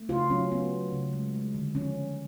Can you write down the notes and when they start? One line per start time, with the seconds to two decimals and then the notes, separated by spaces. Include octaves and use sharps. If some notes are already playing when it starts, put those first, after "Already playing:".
Already playing: A3
0.09 C#3 F4
0.30 F#3 C#4
0.51 F#3 B3
0.72 A3
0.92 C#3
1.13 G#3
1.34 G#3
1.54 D3
1.75 F3 C#4
1.96 F3